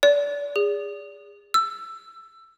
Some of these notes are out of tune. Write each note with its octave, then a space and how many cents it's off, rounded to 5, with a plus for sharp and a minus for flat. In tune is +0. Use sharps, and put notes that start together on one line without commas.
D5 -30
G#4 -25
E6 +15